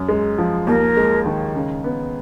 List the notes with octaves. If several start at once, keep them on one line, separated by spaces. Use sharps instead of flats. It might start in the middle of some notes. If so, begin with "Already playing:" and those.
Already playing: F#2
G#3
F3
D#2 A#4
G#3
D#3
C#3
B3